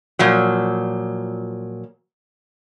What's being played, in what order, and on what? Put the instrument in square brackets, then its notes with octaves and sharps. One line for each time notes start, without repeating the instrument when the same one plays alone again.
[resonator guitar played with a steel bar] A#2 F3 F#3